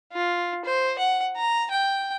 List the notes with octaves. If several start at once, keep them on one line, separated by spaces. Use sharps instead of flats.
F4
C5
F#5
A#5
G5